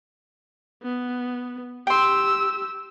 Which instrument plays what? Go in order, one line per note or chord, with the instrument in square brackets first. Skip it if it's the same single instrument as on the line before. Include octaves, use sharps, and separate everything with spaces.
[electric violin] B3
[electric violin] G4 E6 [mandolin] G5 C6